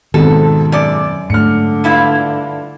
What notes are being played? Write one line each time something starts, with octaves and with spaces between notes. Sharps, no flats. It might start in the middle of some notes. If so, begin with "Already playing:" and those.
F2 G#2 B2 D#3 A4
F#2 D5
G#2 D3 A3 F6 C#7
G2 E4 F4